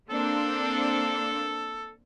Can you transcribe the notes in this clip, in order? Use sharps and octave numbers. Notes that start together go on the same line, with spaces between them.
A#3 C4 D4 A4